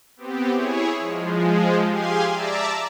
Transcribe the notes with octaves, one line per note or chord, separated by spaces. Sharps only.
B3 C4 G4
E4 G#4 C#5
F3 G#3
G4 G#4 F5 G#5 C6
D5 E5 A5 A#5 D6 E6